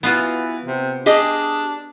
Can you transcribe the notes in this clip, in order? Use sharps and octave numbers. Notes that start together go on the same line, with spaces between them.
E3 B3 F4 F#4
C3
D4 G4 G#4 D#5